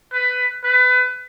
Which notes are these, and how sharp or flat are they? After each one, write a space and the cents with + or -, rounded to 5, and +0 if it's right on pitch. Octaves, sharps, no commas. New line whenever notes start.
B4 +15
B4 +25